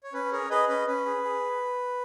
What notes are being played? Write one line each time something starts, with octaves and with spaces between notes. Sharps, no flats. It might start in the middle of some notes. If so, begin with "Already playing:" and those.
C#5
C#4 B4
G#4 A#4 C#5
G#4 B4 D#5
C#4 B4 D#5
C#4 B4
G#4
G#4